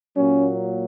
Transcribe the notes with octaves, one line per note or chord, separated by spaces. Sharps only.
A#2 F#3 A#3 C#4